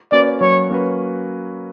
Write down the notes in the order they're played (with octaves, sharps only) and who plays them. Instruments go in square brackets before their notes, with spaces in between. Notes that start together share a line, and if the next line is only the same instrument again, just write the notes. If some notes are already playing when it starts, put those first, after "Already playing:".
[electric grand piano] A#3 C#4 F#4 B4 [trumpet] D5
[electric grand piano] F#3 [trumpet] C#5
[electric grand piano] A#3 C#4 F#4 B4